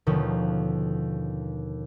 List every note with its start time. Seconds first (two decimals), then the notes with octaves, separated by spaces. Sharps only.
0.07 D#2 B2 D3 D#3 F3 C#4